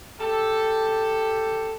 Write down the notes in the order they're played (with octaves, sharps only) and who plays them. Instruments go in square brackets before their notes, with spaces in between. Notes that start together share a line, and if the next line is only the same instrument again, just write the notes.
[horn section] G4 A4